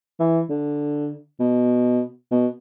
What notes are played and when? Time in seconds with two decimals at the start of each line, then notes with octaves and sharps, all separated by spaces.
0.19 E3
0.49 D3
1.40 B2
2.31 B2